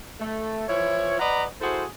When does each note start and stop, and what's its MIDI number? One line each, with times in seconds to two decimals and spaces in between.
0.20 0.65 57
0.68 1.15 52
0.68 1.15 53
0.68 1.15 64
0.68 1.15 73
1.20 1.45 71
1.20 1.45 74
1.20 1.45 75
1.20 1.45 78
1.20 1.45 82
1.20 1.45 83
1.61 1.84 64
1.61 1.84 66
1.61 1.84 68
1.61 1.84 69
1.61 1.84 72